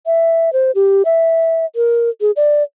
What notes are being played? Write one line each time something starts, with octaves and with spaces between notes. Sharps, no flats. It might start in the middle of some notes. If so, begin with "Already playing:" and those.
E5
C5
G4
E5
A#4
G#4
D5